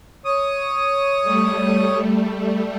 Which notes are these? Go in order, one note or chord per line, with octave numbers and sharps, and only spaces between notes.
C#5 D#6
G3 A3